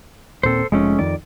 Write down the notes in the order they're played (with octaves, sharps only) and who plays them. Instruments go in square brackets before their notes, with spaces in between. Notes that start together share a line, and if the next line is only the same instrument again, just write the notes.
[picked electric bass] D#1 A#2 C4 [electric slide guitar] A4 C5
[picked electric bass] F1 F3 [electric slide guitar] G#3 A3 C#4
[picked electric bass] F2 D#3 [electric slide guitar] D5